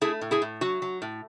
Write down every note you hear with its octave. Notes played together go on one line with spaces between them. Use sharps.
A3 E4 G#4
A2
E4 G#4
A2
F#3 F#4
F#3
A2